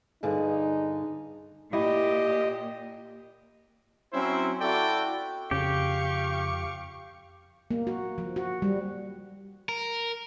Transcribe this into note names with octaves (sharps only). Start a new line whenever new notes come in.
G2 D3 D#4 G#4
A#2 E4 G4 D#5
F#3 C4 C#4 E4 C5
E4 F#4 A4 D5 G5
F2 C#3 G4 F5 C#6
A#3
F#4
F3
F#4
G3
A#4